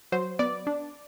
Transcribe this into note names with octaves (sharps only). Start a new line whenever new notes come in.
F#3 C5
B3 D5
D4